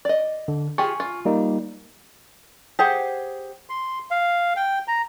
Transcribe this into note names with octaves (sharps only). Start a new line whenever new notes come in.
D5 D#5
D3
F4 G4 G#4 G#5 C#6
F4
G3 A#3 D#4
G4 G#4 C5 F#5
C6
F5
G5
A#5